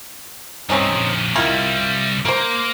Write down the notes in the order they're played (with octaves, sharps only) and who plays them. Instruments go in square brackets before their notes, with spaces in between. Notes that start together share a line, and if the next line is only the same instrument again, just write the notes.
[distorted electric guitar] G2 C3 [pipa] C4 C#4 D#4
[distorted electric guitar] F2 A#2
[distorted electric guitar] C2 G3 [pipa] D#3 E4 F4
[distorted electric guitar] A#3 [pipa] A#4 C5